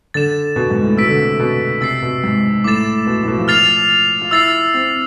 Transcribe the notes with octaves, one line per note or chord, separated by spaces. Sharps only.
D3 A6 E7
B2
G#2
A2
B2 E6 B6 D7
D3
C3
B2
C3 E6 A6 C7
B2
G#2
A2 D6 A6 E7
B2
A2
B2
F3
F6 A6 C7 F7
F4
E4 E6 A6 C7
C4